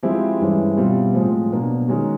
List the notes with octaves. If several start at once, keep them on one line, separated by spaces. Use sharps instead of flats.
F3 G#3 C4 E4 G4
G2 E3 G#3 C#4 E4
B2 G3 C4 F4
A2 F3 G#3 C4
B2 F#3 A#3 D4
D#3 G#3 C#4 F#4